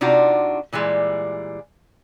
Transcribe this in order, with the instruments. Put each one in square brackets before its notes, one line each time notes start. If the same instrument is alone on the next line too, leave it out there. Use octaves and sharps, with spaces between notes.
[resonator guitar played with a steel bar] C3 D4 D#4 F4 F#4
A#2 E3 G3 G#3